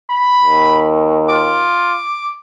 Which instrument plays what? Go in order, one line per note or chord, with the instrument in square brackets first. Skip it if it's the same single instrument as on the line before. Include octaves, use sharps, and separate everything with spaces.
[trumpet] B5
[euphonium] D#2
[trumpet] F4 [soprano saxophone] D6